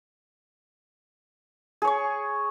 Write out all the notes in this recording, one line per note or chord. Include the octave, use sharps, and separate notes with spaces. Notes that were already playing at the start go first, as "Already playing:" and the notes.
G#4 C#5 C#6